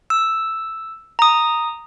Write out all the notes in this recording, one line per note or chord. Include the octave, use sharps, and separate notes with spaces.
E6
A#5 D#6